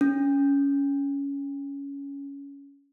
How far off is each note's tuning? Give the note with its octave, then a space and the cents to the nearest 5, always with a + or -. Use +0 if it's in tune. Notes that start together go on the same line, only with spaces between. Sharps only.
C#4 +15